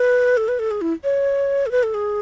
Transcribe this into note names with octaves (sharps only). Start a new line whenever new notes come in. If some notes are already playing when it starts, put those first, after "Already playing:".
Already playing: B4
A4
B4
A4
G#4
E4
C#5
A4
B4
A4
G#4